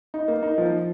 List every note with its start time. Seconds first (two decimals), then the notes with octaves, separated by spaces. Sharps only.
0.14 D#4
0.28 A#3
0.43 D#4
0.58 F3